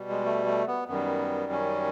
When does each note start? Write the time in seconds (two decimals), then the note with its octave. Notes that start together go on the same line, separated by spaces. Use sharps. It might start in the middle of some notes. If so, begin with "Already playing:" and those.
Already playing: B2 G3
0.09 G#3
0.25 A3
0.46 A3
0.67 B3
0.88 F#2 D#3 G3 B3
1.52 C#4